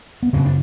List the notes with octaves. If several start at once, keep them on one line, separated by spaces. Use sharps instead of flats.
B3
F#2 C#3 C4
D4